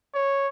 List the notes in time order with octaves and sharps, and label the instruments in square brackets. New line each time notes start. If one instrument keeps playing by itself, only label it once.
[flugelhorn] C#5